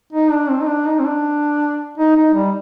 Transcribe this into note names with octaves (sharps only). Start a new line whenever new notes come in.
D#4
D4
C4
D#4
D4
D#4
C4
D4
D#4
D#4
G3